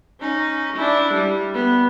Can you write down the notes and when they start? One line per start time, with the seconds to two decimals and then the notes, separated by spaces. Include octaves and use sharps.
0.21 C#4 D#4
0.77 D4 E4
1.13 G3
1.54 B3